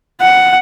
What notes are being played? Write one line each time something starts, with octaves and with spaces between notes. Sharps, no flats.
F#5